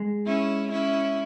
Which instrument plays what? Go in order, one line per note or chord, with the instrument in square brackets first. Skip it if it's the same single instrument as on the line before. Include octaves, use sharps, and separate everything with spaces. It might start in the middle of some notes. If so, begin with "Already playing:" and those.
Already playing: [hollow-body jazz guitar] G#3
[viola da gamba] C#4 E4
C#4 E4